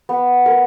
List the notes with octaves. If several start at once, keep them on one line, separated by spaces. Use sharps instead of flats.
B3
A#4